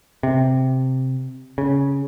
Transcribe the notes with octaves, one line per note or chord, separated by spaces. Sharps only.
C3
C#3